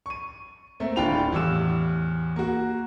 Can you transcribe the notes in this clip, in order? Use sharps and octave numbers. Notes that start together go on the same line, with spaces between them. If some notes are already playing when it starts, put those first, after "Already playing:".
C#6 D#7
A3 A#3 C4
D1 D4 F4 G5 B5 F7
E2 A2 G3 D6 E6 E7
A#3 F#4